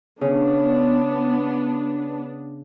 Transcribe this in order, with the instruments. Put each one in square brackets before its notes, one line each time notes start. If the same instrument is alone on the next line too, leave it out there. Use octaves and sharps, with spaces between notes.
[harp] C#3 [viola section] B3 D4